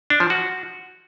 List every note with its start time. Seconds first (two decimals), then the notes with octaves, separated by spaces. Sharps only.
0.10 D4
0.20 F3
0.30 F#4